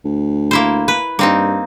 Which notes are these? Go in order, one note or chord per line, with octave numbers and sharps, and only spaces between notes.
D2
A#3 E4 C5
B4
G2 A#3 C4 D#4